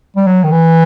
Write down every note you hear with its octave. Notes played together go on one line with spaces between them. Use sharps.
G3
F#3
D#3
E3